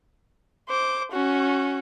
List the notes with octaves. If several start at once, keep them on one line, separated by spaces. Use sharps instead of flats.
C5 D6
C#4 F#4